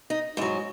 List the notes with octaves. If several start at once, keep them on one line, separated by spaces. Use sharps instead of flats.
D#4
G#2 F#3 E4